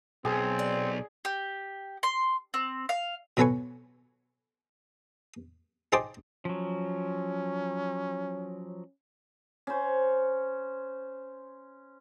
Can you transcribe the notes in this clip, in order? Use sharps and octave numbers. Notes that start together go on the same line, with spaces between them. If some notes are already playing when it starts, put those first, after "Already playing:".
B1 C4 G#4
D5
G4
C6
C4
F5
B2 F#3 A4 B4 G#5 C#6
D#4 G#4 C5 G5 A5 D6
F3 F#3 C#4
C#4 C5